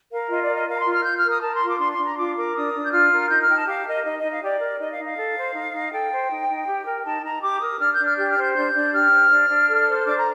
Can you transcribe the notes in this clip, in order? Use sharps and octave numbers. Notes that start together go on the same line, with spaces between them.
A#4 F5
F4 D#5
D5
A#4
D#5
A#4 F5
A#5
C6
F4
F6
F4 G6
F6
A#4
D#6
A#4 A5
C6
F4
D6
D4 C6
C6
D4
A#5
F4 D6
A#4 D6
D4 D#6
D4
G6
F4 F6
A#4
D#4 G6
F6
D#4 G5
A5
G4 F5
A#4 D#5
D#4 D#5
D#5
D#4
F5
G4 D5
A#4
D#4 D#5
F5
D#4
F5
A4
C5
D#4
D#4
A4 G5
C5
D#4
D#4
G4
A#4
D#4 A5
D#4 A#5
G4 D6
A#4 D#6
D4 F6
G6
D4
F6
G4 G6
F6
C5
G6
F6
D4 G6
D4
G4 F6
C5
D4
D4
A4
C5
D4 D6
A#5